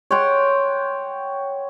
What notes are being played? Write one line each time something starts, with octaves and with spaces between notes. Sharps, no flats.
C#5 F#5 G5 C6